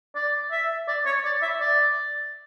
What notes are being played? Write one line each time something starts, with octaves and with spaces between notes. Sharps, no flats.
D5
E5
D5
C#5
D5
E5
D5